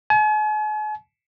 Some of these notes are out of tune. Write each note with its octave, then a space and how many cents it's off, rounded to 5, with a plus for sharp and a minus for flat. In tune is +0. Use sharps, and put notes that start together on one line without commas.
G#5 +45